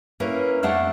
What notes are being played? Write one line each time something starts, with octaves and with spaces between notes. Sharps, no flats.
A#3 C#4 E4 A#4 B4
F2 A3 D4 F5 F#5